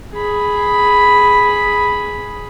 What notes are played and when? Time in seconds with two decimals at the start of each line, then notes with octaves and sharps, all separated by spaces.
0.13 G#4 B5